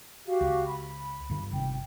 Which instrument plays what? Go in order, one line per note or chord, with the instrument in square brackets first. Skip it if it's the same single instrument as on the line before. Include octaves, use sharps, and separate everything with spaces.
[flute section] F#4 G4 F5
[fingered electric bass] C#2
[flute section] B5
[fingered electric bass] G2 D3
[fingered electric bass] G1 C3 [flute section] G5